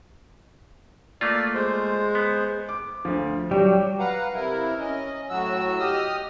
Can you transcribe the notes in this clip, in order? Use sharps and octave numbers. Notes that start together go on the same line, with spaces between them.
A3 A#3 F4 D5
G#3 C5
B3
D6
D2 F3
F#3 G3 G4
B4 F5 F#5 A#5
C3 E4 A#4
C#4 D#5
A2 F#3 F#4 E6
G4 D#5 D#6 F6